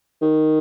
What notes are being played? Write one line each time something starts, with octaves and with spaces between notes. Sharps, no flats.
D#3